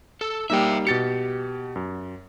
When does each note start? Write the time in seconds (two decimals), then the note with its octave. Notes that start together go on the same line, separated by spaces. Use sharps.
0.21 A4
0.50 G3 A#3 D#4 E5 G5
0.87 B2 G4 A6 C#7
1.76 F#2